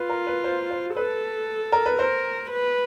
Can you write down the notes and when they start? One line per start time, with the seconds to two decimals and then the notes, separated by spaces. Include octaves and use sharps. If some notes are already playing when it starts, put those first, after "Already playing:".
Already playing: F4 B4
0.09 A#4
0.27 B4
0.44 C5
0.71 C5
0.96 A4 B4
1.72 A#4
1.86 B4
1.99 A#4 C5
2.51 B4